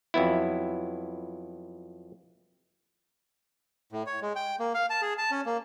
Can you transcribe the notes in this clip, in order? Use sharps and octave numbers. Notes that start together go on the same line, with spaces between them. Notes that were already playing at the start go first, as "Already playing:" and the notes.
F2 F#3 B3 E4
A2
C#5
G#3
G5
A#3
F5
A5
G#4
A5
C#4
A#3